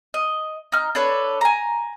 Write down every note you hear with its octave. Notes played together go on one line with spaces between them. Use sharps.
D#5
D#4 F6
D4 A4 B4 C#5
G#5 A#5